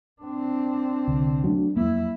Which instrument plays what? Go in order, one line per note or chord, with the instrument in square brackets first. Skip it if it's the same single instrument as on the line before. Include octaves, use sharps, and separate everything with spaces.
[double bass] C4 D4
[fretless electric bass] C2 [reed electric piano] D3
[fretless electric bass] F#3 [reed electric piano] A3 D4 F#4
[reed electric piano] F2 F#3 [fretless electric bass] A#3 [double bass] E4